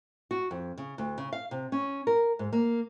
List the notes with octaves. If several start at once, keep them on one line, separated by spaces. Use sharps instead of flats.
F#4
F2
C#3
D2
C#3
F5
C3
C#4
A#4
G#2
A#3